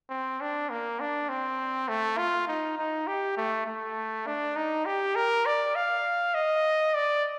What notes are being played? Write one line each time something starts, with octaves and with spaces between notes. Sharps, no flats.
C4
D4
A#3
D4
C4
A3
F4
D#4
D#4
G4
A3
A3
D4
D#4
G4
A#4
D5
F5
D#5
D5